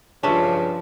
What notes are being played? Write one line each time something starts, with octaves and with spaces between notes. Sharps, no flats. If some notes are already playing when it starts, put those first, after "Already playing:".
G2 C#3 F3 C#4 D4 E5